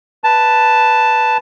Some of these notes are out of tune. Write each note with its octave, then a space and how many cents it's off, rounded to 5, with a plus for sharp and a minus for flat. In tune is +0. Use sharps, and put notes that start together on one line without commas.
B4 +0 A5 +0